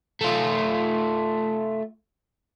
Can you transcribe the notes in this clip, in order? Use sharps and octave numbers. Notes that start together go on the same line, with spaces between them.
A3 F4